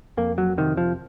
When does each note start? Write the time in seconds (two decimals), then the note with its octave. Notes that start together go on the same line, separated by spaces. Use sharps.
0.17 F2 A#3
0.38 F#3
0.58 C3 D#3
0.77 F3